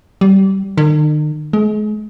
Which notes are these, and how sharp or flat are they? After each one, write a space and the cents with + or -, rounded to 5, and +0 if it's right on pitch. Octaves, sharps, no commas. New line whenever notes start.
G3 -25
D#3 -45
G#3 +35